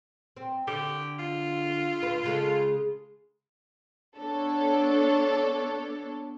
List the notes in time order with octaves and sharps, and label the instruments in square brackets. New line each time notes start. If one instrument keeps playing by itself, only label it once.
[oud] C4
[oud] D3 [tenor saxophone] G4
[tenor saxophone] F4
[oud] D2 D3 B4
C#3 G#3 A4
[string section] B3 D4 A4 C#5